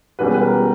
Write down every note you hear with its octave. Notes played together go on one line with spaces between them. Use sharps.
E1 E2 B2 G3 C#4 B4
B4
A#4